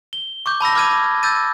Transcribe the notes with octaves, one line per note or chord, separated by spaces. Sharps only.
G7
C#6 D6 G6
A5 B5 E6 A#6
D6 F6 G#6 D#7
E6 G6 A6 D#7